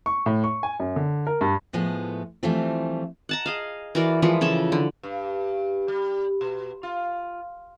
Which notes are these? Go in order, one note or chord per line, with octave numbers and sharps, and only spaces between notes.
C#6
A2
C#6
G#5
F#2
D3
A#4
G2
A2 F3 G#3 A3 B3
E3 F3 G3 A3 C4 F4
F#5 A5 A#5
G#4 D#5 F5
E3 F#4 A#4 D5
E3 F3 G#3 E4
C#3 A4 C#5 A5
D3
G2
G3
B2
F4